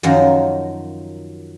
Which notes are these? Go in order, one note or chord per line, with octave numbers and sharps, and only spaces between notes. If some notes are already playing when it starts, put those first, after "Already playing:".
F#2 D#3 F3 F#3